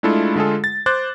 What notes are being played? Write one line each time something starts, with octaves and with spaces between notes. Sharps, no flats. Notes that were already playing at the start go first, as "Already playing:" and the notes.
G#3 A3 D4 E4 F4 A4
D3 G#3 F4 G#4 A4
A6
C5 D6 F#6 A6